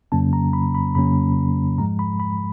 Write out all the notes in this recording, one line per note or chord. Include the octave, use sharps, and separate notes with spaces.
F2 C#3 F#3 A#3 C#4 A5
A#5
B5
B5
F2 C#3 F#3 A#3 C#4 B5
G#2 F3 G#3 A#5
B5
B5